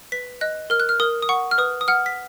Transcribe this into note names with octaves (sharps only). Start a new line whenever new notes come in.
B4 B6
D#5 F#6
A#4 F6
F#6
F6
A#4 D#6
D#6
F#5 C#6
F6
B4 D#6
D#6
F#5 F6
B6